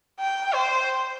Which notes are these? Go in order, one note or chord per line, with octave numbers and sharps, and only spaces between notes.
G5
C5